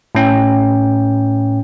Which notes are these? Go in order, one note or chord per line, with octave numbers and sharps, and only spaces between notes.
A2 C#4 G5